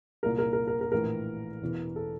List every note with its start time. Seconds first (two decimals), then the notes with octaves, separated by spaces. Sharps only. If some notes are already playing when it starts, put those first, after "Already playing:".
0.23 C2 A#2 A#4
0.38 A#4
0.53 A#4
0.68 A#4
0.81 A#4
0.92 A#1 A2 E3 A#4
1.62 E1 E2 E3
1.96 A4